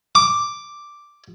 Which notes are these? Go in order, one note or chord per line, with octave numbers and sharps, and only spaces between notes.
D6